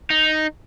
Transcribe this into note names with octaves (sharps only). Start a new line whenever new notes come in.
D#4